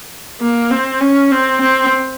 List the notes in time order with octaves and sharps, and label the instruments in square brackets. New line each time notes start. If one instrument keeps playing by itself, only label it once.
[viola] A#3
C4
C#4
C4
C4